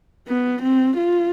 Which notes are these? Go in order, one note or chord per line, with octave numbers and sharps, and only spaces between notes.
B3
C4
F4